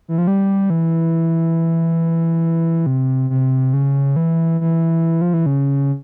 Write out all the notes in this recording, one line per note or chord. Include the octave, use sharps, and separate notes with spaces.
E3
F3
G3
E3
C3
C3
C#3
E3
E3
F3
E3
C#3